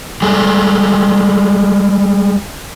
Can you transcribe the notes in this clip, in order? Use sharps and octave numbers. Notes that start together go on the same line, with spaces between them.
G3 G#3 G#4 A4